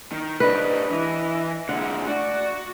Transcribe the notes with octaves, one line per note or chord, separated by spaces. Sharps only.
D#3
G#2 D4 B4 D#5
E3
D3 G#3 F#5
A3 F#4 D5